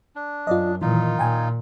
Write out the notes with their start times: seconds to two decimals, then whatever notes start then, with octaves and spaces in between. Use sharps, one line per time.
0.16 D4
0.47 F#2 F4 D5 D#5
0.82 A#2 D#3 E3 D#4 F4
1.19 A#2 G5 G#5